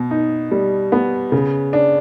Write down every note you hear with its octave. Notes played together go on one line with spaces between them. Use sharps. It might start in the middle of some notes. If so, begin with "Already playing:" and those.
Already playing: B2
D#4
G3
B3
C#3
D4